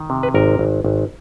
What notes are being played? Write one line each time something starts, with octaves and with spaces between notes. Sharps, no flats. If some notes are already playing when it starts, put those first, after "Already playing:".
Already playing: D#3
C3
B4
G#1 A#4
G#1
G#1